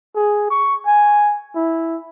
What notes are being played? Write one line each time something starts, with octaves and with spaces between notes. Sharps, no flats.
G#4
C#6
G#5
E4